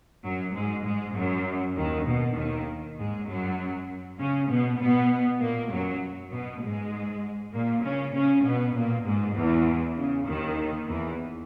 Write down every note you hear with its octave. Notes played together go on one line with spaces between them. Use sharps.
F#2 F#3
G#2 G#3
G#2 G#3
F#2 F#3
D#2 D#3
B2
D#2 D#3
G#2 G#3
F#2 F#3
C#3 C#4
B2 B3
B2 B3
A#2 A#3
F#2 F#3
B2 B3
G#2 G#3
A#2 A#3
C#3 C#4
C#3 C#4
B2 B3
A#2 A#3
G#2 G#3
E2 E3
C#3
D#2 D#3
E2 E3